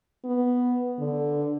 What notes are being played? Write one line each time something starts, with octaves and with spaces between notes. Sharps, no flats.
B3
D3